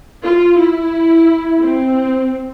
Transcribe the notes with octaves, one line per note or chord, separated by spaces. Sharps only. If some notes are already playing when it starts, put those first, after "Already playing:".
F4
E4
C4